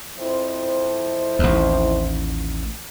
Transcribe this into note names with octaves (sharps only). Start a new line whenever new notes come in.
F2 E4 C5
A1 D#2